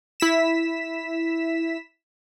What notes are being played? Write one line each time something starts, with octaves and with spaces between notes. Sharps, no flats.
E4 B6 E7